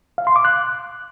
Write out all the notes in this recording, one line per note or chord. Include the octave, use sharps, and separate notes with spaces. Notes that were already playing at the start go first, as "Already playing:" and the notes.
F5
C6
D6
F#6